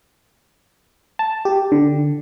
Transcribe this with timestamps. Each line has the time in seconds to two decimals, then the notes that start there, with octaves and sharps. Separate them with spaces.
1.19 A5
1.45 G4
1.72 D3